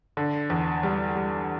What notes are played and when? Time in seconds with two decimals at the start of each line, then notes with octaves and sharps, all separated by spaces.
0.17 D3
0.50 E2
0.83 G3
1.15 G3